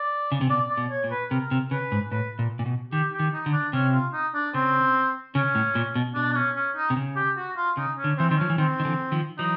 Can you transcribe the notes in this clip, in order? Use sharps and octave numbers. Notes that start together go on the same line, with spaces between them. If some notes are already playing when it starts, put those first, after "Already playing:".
Already playing: D5
C#3
C3
B2 D5
D5
B2
C#5
A#2
B4
C3 A#4
C3
C#3 B4
G#2
A2 B4
A#2
A#2
B2
D#3 G4
G4
D#3
D#4
D3
D4
C3 C#4
F4
D#4
D4
C#3 C4
C#3 C#4
A2
A#2
B2
B2 D4
D4
C#4
C#4
D#4
C3
C#3
G4
F#4
F4
C#3 D#4
C#4
D3
E3 C4
D#3 C4
F3 C#4
E3
D#3 C4
D#3
D3 E3
D#3 F3
E3 F#3 D#4